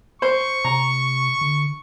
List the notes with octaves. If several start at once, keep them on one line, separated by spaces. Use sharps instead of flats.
C5 C#6
C3 A#5
D3